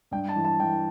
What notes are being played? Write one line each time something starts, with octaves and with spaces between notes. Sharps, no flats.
G2 G5
A5
E3
A5
E3 G5